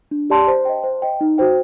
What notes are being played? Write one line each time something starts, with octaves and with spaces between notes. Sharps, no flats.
D4
G4 D5 A5 C6
C5
D#5 G5
C5
D#5 G5
D#4
F#4 C5 G5